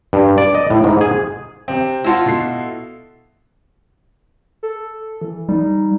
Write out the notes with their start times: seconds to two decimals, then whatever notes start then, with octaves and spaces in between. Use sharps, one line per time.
0.13 G2
0.38 D5
0.55 D#5
0.70 A2
0.84 G#2
1.01 G#4
1.68 C3 C4
2.04 E4 F4 F#5 A5 A#6
2.26 B2 A4 C7
4.63 A4
5.22 E3
5.49 G3 D#4